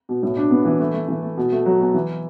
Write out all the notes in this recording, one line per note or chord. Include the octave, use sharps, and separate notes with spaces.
B2
A2
D4
B3
E3
A3
A3
E3
A3
B2
A3
F#3
B2
E3